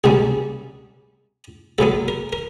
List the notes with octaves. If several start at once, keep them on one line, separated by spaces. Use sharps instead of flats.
C2 B2 G3 A#3 C#4 G#4
A#1 A#2 F#3 B3 A4
A#4
A#4